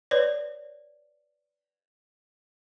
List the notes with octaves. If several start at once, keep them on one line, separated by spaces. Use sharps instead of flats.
B4 C#5 D5